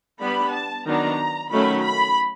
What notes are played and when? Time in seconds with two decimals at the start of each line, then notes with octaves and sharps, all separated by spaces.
0.20 G3 B3 D4 B5
0.53 A5
0.85 D#3 F#3 B3 D4 A#5
1.50 D#3 F#3 A3 C#4 B5
1.82 B5